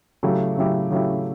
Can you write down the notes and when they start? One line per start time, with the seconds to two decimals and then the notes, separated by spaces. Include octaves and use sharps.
0.23 C#3 F#3 A3 E4 G4
0.57 C#3 F#3 A3 E4 G4
0.90 C#3 F#3 A3 E4 G4